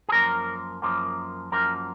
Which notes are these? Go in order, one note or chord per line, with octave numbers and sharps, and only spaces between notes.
G#4
F#2 F3 A#3 A#4
F#2 F3 A#3
F#2 F3 A#3 A#4